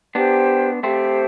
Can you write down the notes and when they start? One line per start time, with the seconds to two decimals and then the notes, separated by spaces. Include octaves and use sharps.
0.15 B3 D4 G4 C5 G5
0.83 A3 C4 G4 C5 G5